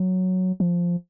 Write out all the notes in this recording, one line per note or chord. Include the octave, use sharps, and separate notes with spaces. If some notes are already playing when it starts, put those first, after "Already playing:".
Already playing: F#3
F3